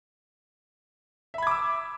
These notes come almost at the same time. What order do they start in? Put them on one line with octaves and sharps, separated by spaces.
E5 B5 G#6 D6 E6